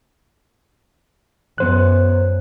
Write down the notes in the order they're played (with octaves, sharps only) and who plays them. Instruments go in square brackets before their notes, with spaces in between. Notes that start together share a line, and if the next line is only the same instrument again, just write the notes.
[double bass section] F#2 [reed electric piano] B3 C5 F#6